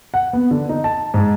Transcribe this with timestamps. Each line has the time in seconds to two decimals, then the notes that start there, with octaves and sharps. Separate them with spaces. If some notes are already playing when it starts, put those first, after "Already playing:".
0.14 F#5
0.33 B3
0.51 D3
0.69 D#4
0.84 A5
1.14 G#2